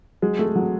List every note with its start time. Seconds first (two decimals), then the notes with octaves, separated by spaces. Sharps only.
0.22 F#3 G#3
0.39 A3
0.56 F#3